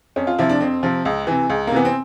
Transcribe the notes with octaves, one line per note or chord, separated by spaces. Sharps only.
F2 C#4
F4
C3 F3 E4
D4
F2 C4
C3 F3
C#2
C3 E3
C#2
A#3
C3 E3 B3
C4